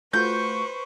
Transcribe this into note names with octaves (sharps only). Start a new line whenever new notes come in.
A3 F4 F#4 B4 C5 C#6 G6